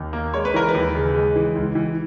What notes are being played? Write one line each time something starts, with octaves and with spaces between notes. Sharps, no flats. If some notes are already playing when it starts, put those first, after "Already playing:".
Already playing: D#2
A#3
G#3 C#5
B4
E3 A#4
B4
D#2
C#3
G#3
E3
C#2
E3